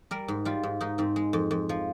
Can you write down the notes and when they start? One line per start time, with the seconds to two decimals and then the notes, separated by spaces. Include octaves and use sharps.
0.11 G3 A#4
0.28 G#2
0.45 G3 F4
0.63 G#2
0.81 G#2 D#4
0.98 G#2 C4
1.16 G#3
1.33 F2
1.51 F2
1.69 F3